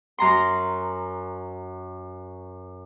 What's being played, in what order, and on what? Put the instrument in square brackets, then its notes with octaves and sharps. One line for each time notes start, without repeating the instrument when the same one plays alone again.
[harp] F#2 A#5 C6